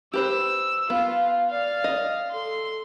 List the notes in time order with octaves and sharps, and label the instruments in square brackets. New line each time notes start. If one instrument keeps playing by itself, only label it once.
[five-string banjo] G4 B4 C5 [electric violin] E6
[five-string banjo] B3 [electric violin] F4 [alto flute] F5
[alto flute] D5 [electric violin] F5
[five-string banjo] D#5
[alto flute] A4 [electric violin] C6